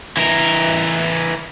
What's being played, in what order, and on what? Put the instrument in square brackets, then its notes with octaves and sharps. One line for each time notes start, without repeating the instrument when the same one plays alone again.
[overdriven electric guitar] E3 A#4